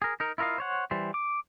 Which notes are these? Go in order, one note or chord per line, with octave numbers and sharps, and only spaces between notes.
G#4 A#4
D#4 A#4
E4 F4 A#4 D#5 F5
C5 C#5 F#5
E3 G3 C5
D6